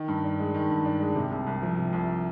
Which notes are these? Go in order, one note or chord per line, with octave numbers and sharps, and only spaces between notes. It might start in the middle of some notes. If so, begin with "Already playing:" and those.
Already playing: D#3
G2
D4
G#3
D#3
G2
D4
G#3
C3
C2
C2
F3
C3
C2